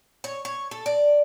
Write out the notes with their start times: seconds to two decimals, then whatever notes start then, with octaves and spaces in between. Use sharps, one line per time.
0.24 C#5
0.45 C#5
0.71 A4
0.86 D5